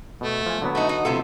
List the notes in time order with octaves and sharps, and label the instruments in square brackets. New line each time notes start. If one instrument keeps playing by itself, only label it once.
[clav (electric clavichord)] B2 [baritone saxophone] A3
[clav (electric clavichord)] F3 G#5
D3 F#3 B3
[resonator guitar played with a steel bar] A3 D#4 [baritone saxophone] F#4
[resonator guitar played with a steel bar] D#4
[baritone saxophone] A2 [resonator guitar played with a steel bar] C3 F4 A4